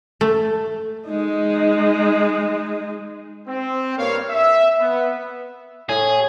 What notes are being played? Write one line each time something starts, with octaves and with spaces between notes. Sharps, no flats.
A3
G#3 D#4
C4
G2 A#3 C#5 F5
E5
B3
A2 G#4